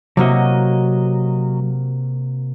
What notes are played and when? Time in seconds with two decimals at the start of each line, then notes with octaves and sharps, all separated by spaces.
0.17 C3 F#3 A#3 F#4 D#5